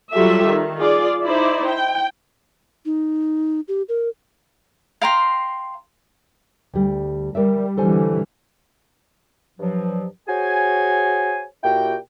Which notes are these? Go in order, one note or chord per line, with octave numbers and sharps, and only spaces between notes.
F#3 G3 F4 G4 A4 E5
D#3
F4 G#4 D5
D#4 E4 C5 D5
G5
D#4
G4
A#4
F5 G5 A#5 C6
D2 G3
G3 A#4 D5 E5
D3 E3 G3 A4 C5 G#5
G2 F3 F#3
F#4 G#4 C5 C#5 G#5
A#2 E4 F#4 G4 G5